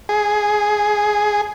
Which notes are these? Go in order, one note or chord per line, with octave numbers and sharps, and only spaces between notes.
G#4